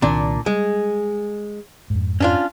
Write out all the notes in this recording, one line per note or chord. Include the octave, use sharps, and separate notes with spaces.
C2 A#2 D#3 C4 D4
G3 G#3
F2 G#2
C#4 D4 F4